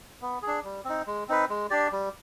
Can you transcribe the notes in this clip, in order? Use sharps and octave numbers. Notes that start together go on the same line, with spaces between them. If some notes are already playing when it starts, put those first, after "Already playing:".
B3
G#4
D4
G3
C4 D#4
G#3
C4 D#4 B4
G#3
D4 G4 D5
G3